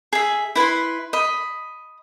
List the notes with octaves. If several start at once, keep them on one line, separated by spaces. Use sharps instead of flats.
G#4 E5
E4 B4 B5 C6
D#5 B5